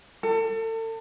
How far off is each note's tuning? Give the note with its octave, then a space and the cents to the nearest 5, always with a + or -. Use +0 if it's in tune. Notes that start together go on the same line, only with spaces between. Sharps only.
A4 +35